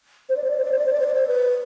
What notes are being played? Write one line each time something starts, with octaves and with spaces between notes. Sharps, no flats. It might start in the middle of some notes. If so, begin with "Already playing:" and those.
C5
D5
C5
D5
C5
D5
C5
D5
C5
D5
C5
D5
C5
B4